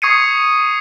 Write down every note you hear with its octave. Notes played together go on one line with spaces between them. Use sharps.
C#6 D#6 G#6 C7 C#7 D#7